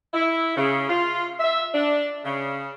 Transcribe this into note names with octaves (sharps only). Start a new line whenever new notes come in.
E4
C#3
F4
E5
D4
C#3